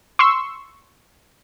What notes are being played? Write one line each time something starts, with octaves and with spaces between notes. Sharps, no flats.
C6 C#6 E6